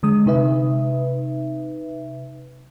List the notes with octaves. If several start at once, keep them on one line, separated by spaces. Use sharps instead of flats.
D3 G#3 D#6
C3 D#4 B4 E5